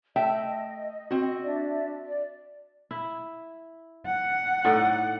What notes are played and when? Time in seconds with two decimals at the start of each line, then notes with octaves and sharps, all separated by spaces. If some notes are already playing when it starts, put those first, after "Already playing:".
0.16 A3 D#5 E5 G5
1.11 C4 F#4
1.43 D4 D5 E5
2.05 D5
2.91 E4
4.06 F#5
4.65 A2 D#4 D5